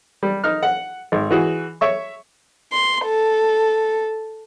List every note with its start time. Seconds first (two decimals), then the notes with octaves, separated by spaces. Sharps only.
0.23 G3
0.44 D#4 F6
0.63 F#5
1.12 G#1
1.30 E3 F#4 G#4
1.81 C#5 E5 C#6
2.73 C6
3.05 A4